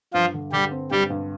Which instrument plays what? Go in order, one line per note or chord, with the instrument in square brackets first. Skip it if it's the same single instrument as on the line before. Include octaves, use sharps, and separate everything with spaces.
[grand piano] G2 [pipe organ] F3 F4
[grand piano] D3
[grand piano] D3 [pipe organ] G3 G4
[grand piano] C4
[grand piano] G2 [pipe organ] G3 G4
[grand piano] G2